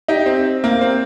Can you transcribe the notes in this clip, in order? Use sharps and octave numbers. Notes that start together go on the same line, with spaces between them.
D#4 G4
C4
A#3
C4